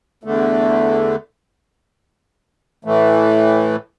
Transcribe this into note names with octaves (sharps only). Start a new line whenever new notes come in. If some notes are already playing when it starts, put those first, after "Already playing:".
E2 D3 A3
A2 E3 A3